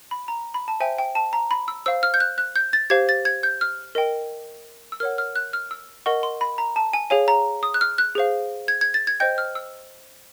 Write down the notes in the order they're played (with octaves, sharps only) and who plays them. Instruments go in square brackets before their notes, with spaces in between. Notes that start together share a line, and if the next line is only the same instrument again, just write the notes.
[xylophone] B5
A#5
B5
A5
C5 E5 G5 G#5
G5
A5
A#5
B5
E6
C5 F5 E6
F6
G6
F#6
F#6
G6
A6
G4 C5 F5 G#6
A6
G#6
G6
F6
A#4 D#5 G5
E6
A#4 C#5 F#5 F6
F6
F#6
F6
E6
A#4 D#5 F#5 C#6
C6
B5
A#5
A5
G#5
G#4 C#5 F5 G#5
A#5
D#6
F#6
F6
F#6
G#4 C5 F5
G#6
G#6
A6
G#6
C5 D#5 G5 G6
F6
E6